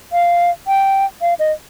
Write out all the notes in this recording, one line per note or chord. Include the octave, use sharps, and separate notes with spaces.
F5
G5
F5
D#5